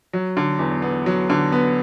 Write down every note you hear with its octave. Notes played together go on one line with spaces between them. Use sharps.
F#3
D3
E2
B3
F#3
D3
B3